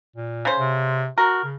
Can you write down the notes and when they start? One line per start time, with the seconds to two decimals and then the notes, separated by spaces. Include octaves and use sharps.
0.16 A#2
0.45 C#3 C5
0.60 C3
1.18 F#4 A#4
1.44 C#3